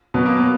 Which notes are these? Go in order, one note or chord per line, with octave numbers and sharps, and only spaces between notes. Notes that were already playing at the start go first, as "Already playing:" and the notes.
B2 F#3 B3
A#3
B3